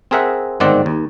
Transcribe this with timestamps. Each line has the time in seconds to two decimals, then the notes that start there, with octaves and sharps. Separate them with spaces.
0.11 C4 G#4 A#4 E5 F#5
0.60 G1 G#2 D#3 C4 D5 F#5
0.86 D#2